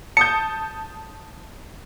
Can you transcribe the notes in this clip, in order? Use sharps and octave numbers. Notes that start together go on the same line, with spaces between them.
A5 D#6 G6 C#7